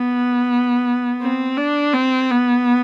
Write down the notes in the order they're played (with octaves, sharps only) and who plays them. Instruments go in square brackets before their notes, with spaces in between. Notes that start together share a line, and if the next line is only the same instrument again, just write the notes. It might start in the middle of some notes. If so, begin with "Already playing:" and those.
Already playing: [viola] B3
C4
D4
C4
B3